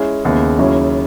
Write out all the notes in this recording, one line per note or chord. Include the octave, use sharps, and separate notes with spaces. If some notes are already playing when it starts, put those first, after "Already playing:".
Already playing: G#3 C#4 E4
D#2 C#3 G#3 B3 E4
D#2 C#3 F#3 C#4 E4